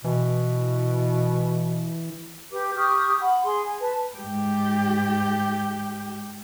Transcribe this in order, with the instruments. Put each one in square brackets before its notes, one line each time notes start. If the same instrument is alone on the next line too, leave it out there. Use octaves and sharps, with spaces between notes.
[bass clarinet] B2 [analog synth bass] E3
[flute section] G4 B4 D6
G4 C#6 D#6 F6
F#5 B5
G#4 C6
G#5
B4 A5
[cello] G#2 G4